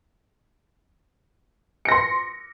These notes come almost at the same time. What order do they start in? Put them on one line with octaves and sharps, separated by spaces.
C#7 A#6 C6